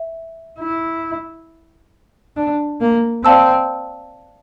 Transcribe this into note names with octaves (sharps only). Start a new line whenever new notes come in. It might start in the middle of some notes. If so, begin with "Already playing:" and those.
Already playing: E5
E4
D4
A#3
C4 D5 F5 A5 E6